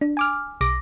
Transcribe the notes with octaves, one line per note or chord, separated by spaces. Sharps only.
D4
G#5 D6 F6
B1 D6 A#6